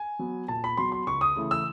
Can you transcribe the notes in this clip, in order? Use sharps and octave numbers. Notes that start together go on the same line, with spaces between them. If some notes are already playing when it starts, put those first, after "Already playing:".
Already playing: G#5
F#3 B3
A#2 A5
B5
F#3 B3 C6
C6
C#2 C#6
D#6
C#3 E3 A3
E6